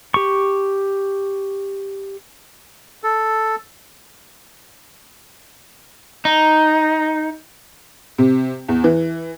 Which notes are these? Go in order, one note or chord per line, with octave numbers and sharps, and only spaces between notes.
G4 C#6
A4
D#4
C3
E2
E3